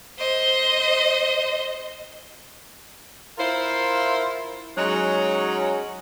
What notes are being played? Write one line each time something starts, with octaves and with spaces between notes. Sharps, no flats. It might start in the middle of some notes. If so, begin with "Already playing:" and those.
C5 D#5
E4 F4 A#4 C5 E5 F5
F#3 G#3 C#4 D#4 F#4